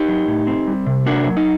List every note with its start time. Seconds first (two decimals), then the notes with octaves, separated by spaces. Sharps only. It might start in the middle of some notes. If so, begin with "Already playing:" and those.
Already playing: D#4 G4
0.08 F#3
0.27 A2
0.47 C4
0.67 G3
0.86 C3
1.06 A#3 D4 F#4
1.27 F#3
1.37 D#4